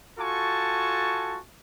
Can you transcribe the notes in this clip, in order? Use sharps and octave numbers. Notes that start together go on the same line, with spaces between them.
F4 F#4 A4 G#5 A5 C#6